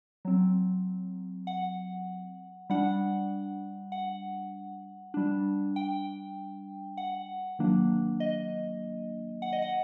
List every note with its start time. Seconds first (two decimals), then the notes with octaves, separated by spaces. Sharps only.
0.25 F#3 C4
1.47 F#5
2.70 G3 D4 F#5
3.92 F#5
5.14 G3 D4
5.76 G5
6.97 F#5
7.59 D#3 F#3 A#3 D4
8.20 D#5
9.42 F#5
9.53 D#5
9.62 F#5